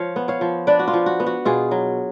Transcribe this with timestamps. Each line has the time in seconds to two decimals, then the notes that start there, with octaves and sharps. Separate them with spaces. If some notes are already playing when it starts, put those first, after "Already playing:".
Already playing: F3 C#5 F5
0.16 B3
0.28 C#5 F5
0.41 F3
0.67 D4 B4 D5
0.79 F#4
0.88 F4
0.93 F3
1.06 F#4
1.20 B3
1.26 F#4
1.45 B2 F4 G#4
1.71 F#3